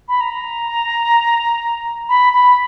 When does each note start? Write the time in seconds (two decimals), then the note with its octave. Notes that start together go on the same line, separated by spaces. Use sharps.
0.08 B5
0.20 A#5
2.09 B5
2.33 B5